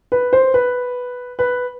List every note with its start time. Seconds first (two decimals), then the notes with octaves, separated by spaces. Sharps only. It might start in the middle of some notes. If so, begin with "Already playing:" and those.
0.12 B4
0.33 C5
0.54 B4
1.39 B4